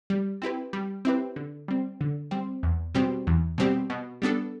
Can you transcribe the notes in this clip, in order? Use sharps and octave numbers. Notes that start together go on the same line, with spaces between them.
G3
C4 E4 G4 B4
G3
C4 E4 G4 B4
D3
G3 C4
D3
G3 C4
E2
B2 G3 C4 G4
E2
B2 G3 C4 G4
B2
G3 B3 D4 A4